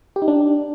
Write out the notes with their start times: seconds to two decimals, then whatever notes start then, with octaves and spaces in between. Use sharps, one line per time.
0.16 G4
0.22 D#4
0.28 D4